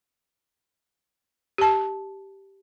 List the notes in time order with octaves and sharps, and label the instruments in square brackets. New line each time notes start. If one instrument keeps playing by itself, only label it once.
[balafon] G4 A5